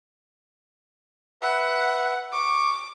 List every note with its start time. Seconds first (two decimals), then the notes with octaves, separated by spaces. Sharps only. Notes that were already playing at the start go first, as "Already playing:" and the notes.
1.42 B4 E5 F#5
2.32 C#6 D6